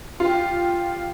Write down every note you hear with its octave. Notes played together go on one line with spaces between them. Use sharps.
F4 G4